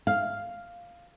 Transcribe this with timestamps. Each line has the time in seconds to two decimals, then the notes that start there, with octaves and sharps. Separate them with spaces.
0.07 F5